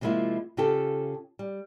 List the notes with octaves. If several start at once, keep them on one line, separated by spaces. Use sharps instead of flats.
C3 F3 G#3 A#3 E4 F4
C#3 F4 G4 A4
G3